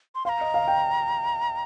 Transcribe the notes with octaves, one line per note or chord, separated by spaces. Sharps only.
C6
F5 A#5 C6
D#5
F5
G5